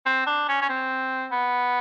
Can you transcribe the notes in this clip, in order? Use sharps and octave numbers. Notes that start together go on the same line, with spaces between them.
C4
D4
C#4
C#4
C4
B3